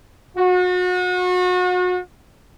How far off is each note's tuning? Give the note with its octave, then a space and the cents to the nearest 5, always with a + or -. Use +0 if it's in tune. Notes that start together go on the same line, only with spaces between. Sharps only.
F#4 -35